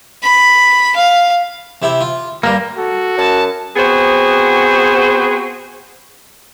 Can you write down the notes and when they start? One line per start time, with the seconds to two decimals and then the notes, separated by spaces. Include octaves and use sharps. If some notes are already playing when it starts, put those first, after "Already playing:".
0.23 B5
0.96 F5
1.82 C3 E4 G4
2.01 F4
2.43 G2 G3 A#3
2.77 F#4 A4
3.18 F#2 A5
3.76 B3 C4 F#4 G#4 C5